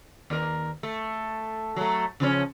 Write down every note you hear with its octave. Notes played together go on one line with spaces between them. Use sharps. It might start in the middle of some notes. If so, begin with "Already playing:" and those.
D#2 A#4
A3
F#3 A3
C#3 F3 C#4